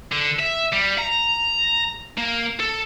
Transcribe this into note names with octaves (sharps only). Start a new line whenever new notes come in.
D3
E5
G3
A#5
A#3
A4